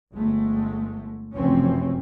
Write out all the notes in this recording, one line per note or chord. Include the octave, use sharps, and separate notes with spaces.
G1 G#3 A3
F1 C#2 F#2 E3 C4 C#4